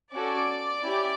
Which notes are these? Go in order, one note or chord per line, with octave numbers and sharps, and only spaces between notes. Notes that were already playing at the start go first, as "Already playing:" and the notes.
C#4 F#4 A4 D5 D6
C#4 E4 G4